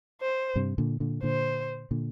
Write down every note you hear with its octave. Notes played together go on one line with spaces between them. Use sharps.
C5
G2 C3
A#2 D3
A#2 D3
A#2 D3 C5
A#2 D3